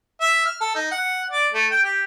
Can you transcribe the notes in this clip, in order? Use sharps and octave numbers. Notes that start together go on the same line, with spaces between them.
E5
F6
A4
D#4
F#5
D5
A3
G5
G4